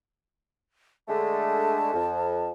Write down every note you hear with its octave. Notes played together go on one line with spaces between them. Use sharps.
D3 G#3 A3 A5
F2